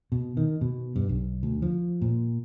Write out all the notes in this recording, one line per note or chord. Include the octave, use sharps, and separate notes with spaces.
B2
D#3
B2
G2
B1
D2
F3
A#2